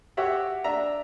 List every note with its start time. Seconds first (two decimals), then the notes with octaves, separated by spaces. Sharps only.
0.17 F#4 G4 C#5 E5 F#5
0.64 D4 E5 A#5